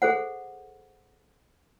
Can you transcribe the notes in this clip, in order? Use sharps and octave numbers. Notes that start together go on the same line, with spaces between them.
G#4 A4 C5 F#5